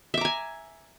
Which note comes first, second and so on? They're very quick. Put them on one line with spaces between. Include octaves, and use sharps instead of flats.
E5 D6 A#5 G#5